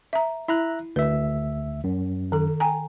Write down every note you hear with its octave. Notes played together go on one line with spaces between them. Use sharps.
E5 A#5
E4 E5 A#5 F#6
D2 B4 E5
F#2
D#3 A4
G5 G#5 A#5